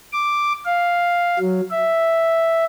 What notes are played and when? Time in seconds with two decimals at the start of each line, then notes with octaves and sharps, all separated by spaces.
0.12 D6
0.65 F5
1.40 F#3
1.71 E5